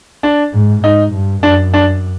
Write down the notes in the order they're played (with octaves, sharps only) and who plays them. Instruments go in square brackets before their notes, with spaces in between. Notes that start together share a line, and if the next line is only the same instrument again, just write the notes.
[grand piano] D4
[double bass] G#2
[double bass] G#2 [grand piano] D#4
[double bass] G2
[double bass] F#2 [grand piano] D4
[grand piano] D4